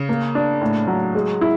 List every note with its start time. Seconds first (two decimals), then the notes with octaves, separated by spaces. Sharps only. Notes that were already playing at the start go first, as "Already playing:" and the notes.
Already playing: C#3
0.09 A#3
0.35 D4
0.61 A2
0.88 F#3
1.15 G#3
1.41 E4